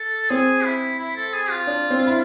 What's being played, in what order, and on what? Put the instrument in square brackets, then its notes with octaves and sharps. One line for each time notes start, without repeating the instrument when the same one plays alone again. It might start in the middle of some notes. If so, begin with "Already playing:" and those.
Already playing: [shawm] A4
[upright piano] C4 [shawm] G#4
[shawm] E4
E4
A4
G#4
F4
[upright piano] D4
C4
E4